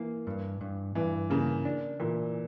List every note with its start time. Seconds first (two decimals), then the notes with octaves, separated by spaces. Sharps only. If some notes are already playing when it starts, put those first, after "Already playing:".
Already playing: E3 A#3
0.27 G2
0.61 G2
0.95 G2 E3
1.30 C#3 A#3
1.65 D4
2.00 A#2 E3